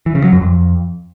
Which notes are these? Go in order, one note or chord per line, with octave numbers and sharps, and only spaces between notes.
E3
C#3
F#3
F#2
F2